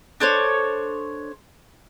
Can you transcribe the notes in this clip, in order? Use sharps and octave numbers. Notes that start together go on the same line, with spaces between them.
D4 A4 C5 C#5